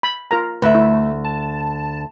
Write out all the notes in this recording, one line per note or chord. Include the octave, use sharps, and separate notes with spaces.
B5
F4 A#4 A#5
D2 B4 E5
A3 E4
A5